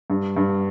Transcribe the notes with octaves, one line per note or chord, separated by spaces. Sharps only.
G2
G2